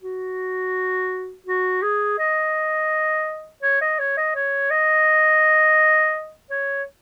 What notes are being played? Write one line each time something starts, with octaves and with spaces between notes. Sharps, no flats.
F#4
F#4
G#4
D#5
C#5
D#5
C#5
D#5
C#5
D#5
C#5